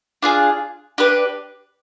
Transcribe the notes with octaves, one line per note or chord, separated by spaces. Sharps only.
D4 F4 G#4
D4 G4 B4